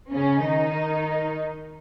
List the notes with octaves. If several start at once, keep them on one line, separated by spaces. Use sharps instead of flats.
C#3 C#4
D#3 D#4